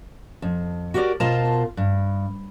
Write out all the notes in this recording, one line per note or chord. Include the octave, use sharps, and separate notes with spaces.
F2
F#4 G4 A#4 C5 D5
B2 F4 A#4 C5 A5
G2